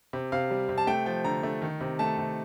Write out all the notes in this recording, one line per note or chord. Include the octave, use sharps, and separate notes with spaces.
C3
C3 F5
G3
C3
A5
A3 G5
F3 G5
D3 A#5
A3
D#3
C3
A3 A5
C3